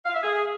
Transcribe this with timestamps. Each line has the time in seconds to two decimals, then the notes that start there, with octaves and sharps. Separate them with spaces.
0.05 F5
0.14 E5
0.23 G#4